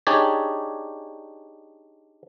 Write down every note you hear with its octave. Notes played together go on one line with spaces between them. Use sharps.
D4 D#4 G4 G#4 C#5 D5